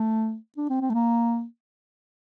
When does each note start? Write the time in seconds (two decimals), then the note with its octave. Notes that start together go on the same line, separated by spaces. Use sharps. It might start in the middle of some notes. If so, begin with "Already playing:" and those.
Already playing: A3
0.57 D4
0.69 C4
0.81 C4
0.90 A3
0.94 A#3